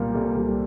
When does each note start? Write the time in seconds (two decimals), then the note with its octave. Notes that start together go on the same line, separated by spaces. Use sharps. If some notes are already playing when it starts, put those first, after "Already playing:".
Already playing: C2 A#2 G3 A#3
0.14 C2 A4
0.37 G3